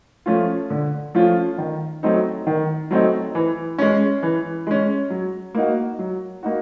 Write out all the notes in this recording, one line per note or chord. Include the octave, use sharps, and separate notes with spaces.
F3 A3 C#4 F4
D3
F3 A3 C#4 F4
D#3
F#3 A3 C4 D#4
D#3
F#3 A3 C4 D#4
E3
G#3 C#4
E3
G#3 C#4
F#3
A#3 D#4 F#4
F#3
A#3 D#4 F#4